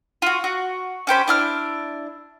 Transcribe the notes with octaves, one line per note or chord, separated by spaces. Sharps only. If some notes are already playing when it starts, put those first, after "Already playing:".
F4 F#4
F#4
C#4 G4 C5 B5
D4 E4 F6